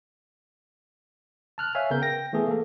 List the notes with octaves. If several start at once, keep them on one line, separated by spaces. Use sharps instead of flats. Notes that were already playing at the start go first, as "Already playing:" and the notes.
A5 F6 F#6
C#5 E5 F5 G#5
C#3 B3 A#4 G6
G5 A#6
E3 A3 B3 G#4 A4
A#3 A4